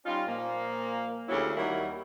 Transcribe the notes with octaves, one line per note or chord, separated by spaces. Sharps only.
G3 C#4 D#4 F4
A#2 F3 A#3
D2 C#3 F#3 C#4 E4 G4
D#2 F#3 G3 E4 A#4